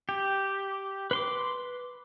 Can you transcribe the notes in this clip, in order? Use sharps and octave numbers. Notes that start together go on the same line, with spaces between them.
G4
B4 C6 D6